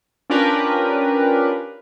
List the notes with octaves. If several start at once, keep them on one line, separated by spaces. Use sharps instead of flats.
C#4 D4 F4 G4 A#4 B4